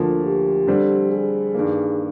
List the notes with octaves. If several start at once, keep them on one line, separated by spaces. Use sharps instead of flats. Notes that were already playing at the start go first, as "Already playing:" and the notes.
Already playing: D2 D3 F3 A#3 F4
G4
D3 G3 C4
G#4
G2 D#3 A#3